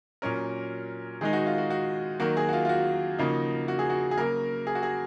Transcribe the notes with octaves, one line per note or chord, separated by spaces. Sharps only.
A#2 F#3 C#4 A#4
D#3 G#3 D#4 G#4
F#4
F4
F#4
F#4
D#3 F#3 A#3 F#4
G#4
F#4
F4
F4
F#4
C#3 F3 A#3 D#4
F#4
G#4
F#4
G#4
C#3 F#3 A#3 A#4
G#4
F#4
G#4